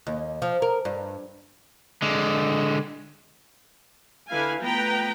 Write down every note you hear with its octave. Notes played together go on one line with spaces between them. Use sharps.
D#2
F3
A#4
G2
D3 G#3
D3 E4 B4 F5 G#5
F3 A3 B3 B4 G5 A#5